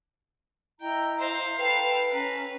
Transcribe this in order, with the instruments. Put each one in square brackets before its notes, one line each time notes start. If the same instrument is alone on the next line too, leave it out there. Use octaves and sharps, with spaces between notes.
[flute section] E4 D#5 A#5 [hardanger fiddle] G5
[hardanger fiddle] C5 F5
[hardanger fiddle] A4 F5 [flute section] B4 G5
[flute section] C#4 A#5 [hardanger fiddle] B4